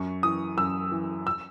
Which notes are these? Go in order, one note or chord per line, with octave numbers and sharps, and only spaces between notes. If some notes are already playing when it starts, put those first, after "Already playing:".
Already playing: F#2 C#6
E3 D#6
F#2 E6
E3
E6